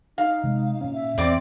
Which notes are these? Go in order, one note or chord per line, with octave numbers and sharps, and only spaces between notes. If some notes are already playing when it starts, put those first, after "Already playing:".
D#4 F5
C3 G#3
A#2 C#4
E5
E2 C4 D5